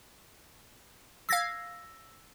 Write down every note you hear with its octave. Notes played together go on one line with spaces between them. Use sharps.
F5 E6 G#6 A#6 B6